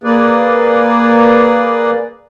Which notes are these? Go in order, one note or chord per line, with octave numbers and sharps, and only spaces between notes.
A#3 G#4 B4 D5